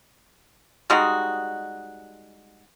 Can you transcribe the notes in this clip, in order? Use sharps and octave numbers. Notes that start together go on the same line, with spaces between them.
G3 G#3 D#4 F#4